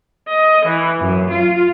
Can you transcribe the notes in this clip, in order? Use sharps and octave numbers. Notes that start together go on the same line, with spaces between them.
D#5
E3
F#2
F4